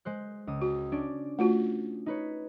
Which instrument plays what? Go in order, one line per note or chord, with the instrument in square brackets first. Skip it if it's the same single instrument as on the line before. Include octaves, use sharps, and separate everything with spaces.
[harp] G#3 C5 F#6
C#2 D#6
[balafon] F#4
[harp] C#4 D4 D5
[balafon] A3 F4 F#4
[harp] D#4 B4 C#5